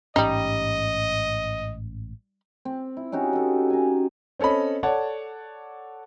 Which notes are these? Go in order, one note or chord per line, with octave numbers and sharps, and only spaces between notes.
A1 G#2 G3 C#4 D#4 D#5
C4
E4
C#4 D#4 F#4 G4
A4 D#5
G#5 A#5
C4 C#4 A4 D#5 B5
A4 C#5 D5 F#5 A5